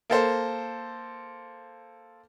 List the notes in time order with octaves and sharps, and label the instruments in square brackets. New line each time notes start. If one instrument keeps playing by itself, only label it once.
[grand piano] A#3 A4 C5